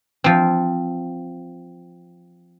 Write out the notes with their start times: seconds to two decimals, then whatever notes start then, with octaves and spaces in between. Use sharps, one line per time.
0.24 F3 C4